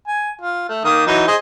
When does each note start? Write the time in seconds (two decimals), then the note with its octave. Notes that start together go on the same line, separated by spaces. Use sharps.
0.08 G#5
0.42 F4
0.69 A3
0.85 D#3 A#3 D#6
1.07 E3 F#3 D#4
1.27 G#4 C5 D#5